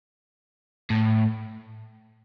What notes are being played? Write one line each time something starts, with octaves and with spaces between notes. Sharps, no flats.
A2